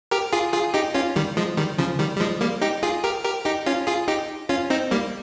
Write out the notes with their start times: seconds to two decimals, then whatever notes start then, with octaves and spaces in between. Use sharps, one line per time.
0.11 G4 A#4
0.33 F4 G#4
0.53 F4 G#4
0.74 D#4 G4
0.94 C#4 F4
1.16 D#3 G3
1.37 F3 G#3
1.57 D#3 G3
1.78 C#3 F3
1.99 D#3 G3
2.16 G3
2.20 F3 G#3
2.41 G3 A#3
2.61 D#4 G4
2.83 F4 G#4
3.04 G4 A#4
3.24 G4 A#4
3.45 D#4 G4
3.66 C#4 F4
3.87 F4 G#4
4.08 D#4 G4
4.49 C#4 F4
4.70 C4 D#4
4.91 G3 A#3